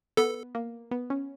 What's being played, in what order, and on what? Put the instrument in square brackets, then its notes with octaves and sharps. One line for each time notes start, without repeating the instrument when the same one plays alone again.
[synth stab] B3 [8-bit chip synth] A4
[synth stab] A#3
B3
C#4